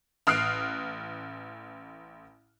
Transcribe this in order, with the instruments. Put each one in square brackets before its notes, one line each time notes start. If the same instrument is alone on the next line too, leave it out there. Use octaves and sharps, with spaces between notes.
[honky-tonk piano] A1 D#6 F6 F#6 C7 D7